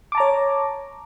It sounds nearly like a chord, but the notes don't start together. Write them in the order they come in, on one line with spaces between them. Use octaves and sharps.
D6 A5 A#5 C#5